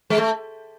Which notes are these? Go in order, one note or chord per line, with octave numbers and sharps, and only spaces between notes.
G#3
A3